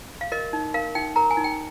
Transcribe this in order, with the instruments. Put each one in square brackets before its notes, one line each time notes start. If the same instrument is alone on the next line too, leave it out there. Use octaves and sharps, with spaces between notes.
[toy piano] F5
A#4 D#5
D#4
A#4 F5
D#4 G5
A#4 A#5
G#5
D#4
G5